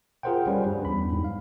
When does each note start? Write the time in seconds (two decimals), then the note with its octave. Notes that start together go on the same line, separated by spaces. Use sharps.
0.23 F4 G#4 A#4 C5 F#5 G5
0.47 G3 C#4 B4
0.66 G2
0.85 E2 B5
1.13 G#2
1.24 F5